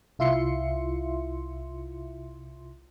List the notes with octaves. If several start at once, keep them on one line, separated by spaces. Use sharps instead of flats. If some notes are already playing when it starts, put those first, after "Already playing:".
C2 E4 F4 E5 C6 C#7